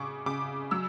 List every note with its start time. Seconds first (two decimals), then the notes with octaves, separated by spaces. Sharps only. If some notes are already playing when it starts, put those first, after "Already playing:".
Already playing: C#3 C#6 D6
0.26 C#3 D6
0.71 F#3 E6